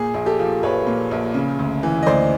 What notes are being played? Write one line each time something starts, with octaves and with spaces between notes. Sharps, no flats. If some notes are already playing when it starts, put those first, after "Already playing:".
Already playing: A#2 G#4
A#1
G4 A4
F3
A#1 B4 C#5
A#2
A#1
C#3
D2
E3
D#5
D2 C5 D5